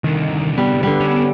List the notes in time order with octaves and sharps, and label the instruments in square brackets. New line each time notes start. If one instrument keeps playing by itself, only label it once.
[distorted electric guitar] C2 D3 [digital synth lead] D#3
[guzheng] G3 [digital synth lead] B3
[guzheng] D3 G3
[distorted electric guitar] C#4 D4